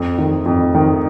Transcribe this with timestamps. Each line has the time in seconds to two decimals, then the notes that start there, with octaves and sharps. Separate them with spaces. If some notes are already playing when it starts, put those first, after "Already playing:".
Already playing: F2
0.18 D#3
0.46 F2
0.74 D#3